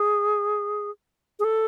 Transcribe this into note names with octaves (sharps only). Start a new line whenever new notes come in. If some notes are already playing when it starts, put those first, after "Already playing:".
Already playing: G#4
G#4
A4